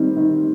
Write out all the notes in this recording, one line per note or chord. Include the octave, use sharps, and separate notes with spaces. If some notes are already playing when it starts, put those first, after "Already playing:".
Already playing: D#3 G3 C4
D#3